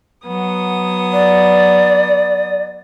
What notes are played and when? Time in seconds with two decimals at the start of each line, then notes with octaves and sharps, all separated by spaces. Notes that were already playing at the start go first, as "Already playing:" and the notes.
0.24 F#3 B3 D#6
1.13 D5